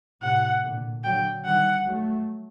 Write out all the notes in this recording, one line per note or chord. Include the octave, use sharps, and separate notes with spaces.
A2 C3 F#5
A#2 D3
D3 F#3 G5
D#3 G3 F#5
F#3 A3